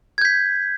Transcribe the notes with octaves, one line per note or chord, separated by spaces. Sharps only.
G6 G#6 B6